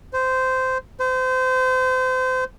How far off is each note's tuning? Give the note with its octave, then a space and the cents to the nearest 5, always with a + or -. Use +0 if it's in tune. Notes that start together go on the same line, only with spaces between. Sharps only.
C5 -15
C5 -30